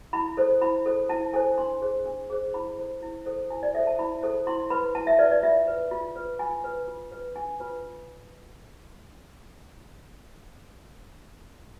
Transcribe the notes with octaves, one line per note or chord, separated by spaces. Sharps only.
E4 B5
A4 C5
E4 B5
A4 C5
E4 A5
A4 C5 G#5
D4 C6
G#4 C5
D4
G#4 C5
E4 B5
A4 C5
E4
A4 C5
E4 G#5
D5
A4 C5 E5
A5
E4 B5
A4 C5
E4 C6
B4 B5
E4 A5
E5
B4 D5
D5
F4 E5
B4
F4
B4
F4 G#5
B4
F4
B4
D4 G#5
F4 B4